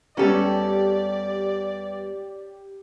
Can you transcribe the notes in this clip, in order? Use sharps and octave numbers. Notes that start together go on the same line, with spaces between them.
E2 G3 C#4 G4 A4 D5